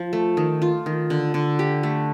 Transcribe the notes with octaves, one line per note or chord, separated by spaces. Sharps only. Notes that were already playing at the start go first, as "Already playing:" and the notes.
Already playing: F3
A3
D#3
F4
D#3
D3
D3
G4
A3